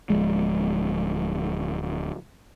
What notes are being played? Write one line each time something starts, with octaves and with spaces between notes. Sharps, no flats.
D1 F3 G#3